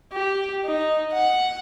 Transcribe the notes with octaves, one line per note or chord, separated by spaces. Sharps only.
G4
D#4
F#5